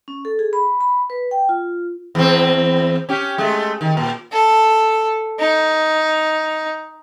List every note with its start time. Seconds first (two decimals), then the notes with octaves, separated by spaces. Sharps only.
0.08 C#4
0.25 A4
0.39 G#4
0.53 B5
0.81 B5
1.10 B4
1.31 G5
1.49 F4
2.15 E2 C4
3.09 C#4 G4
3.38 G#3 A3
3.81 D#3
3.97 A#2
4.32 A4
5.39 D#4